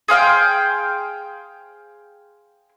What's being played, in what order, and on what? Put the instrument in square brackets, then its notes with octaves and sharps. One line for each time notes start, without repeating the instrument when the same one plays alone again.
[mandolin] G#4 C5 F5 G5